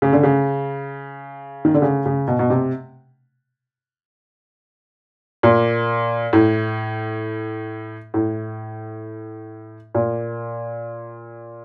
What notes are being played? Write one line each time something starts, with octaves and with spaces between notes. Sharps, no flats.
C#3
D3
C#3
D#3
D3
C#3
C#3
B2
B2
C3
A#2
A2
A2
A#2